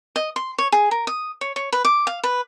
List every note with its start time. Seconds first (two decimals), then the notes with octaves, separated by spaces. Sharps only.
0.16 D#5
0.36 C6
0.58 C#5
0.72 G#4
0.91 A#4
1.07 D#6
1.41 C#5
1.56 C#5
1.72 B4
1.85 D6
2.07 F5
2.23 B4